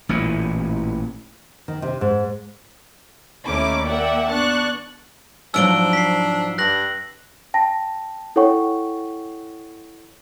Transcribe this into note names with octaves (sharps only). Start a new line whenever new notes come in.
A1 A#2 E3
D#3
C3
G#2
D#2 A3 C#4 D#4 E4 D6
A#3 D5 E5 F#5 G5
G#1 B3 D4 C#6 F#6 A6
G#2 F3 F#3 D4 E6 D7 G7
B6 C7
G2 F#6 A#6 F#7
G5 A5 A#6
E4 A4 C#5 F#5 G5 C#6